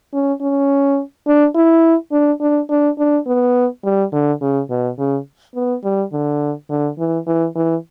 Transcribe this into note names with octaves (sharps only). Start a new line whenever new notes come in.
C#4
C#4
D4
E4
D4
D4
D4
D4
B3
G3
D3
C#3
B2
C#3
B3
G3
D3
D3
E3
E3
E3